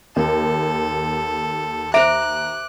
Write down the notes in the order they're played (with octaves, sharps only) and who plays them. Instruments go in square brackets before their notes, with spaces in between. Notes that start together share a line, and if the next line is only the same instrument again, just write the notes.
[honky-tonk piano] D#2 [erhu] A4
[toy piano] C5 E5 [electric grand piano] A#5 D6 D7 [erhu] F#6